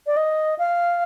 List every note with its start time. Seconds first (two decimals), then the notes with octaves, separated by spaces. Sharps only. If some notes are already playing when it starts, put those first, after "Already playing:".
0.07 D5
0.17 D#5
0.59 F5